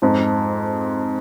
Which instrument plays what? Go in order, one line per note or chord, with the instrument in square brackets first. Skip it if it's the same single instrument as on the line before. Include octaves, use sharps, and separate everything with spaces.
[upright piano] F2 G#2